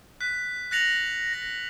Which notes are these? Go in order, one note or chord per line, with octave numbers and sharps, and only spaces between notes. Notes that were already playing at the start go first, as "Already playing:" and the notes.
F#6 B6
F#6 A6 A#6 C#7 F7 F#7
A#6